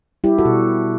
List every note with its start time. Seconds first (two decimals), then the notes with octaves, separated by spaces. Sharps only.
0.24 G3 E4 G4
0.38 F#4 A4
0.45 B2